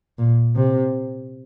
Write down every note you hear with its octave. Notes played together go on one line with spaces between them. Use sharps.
A#2
C3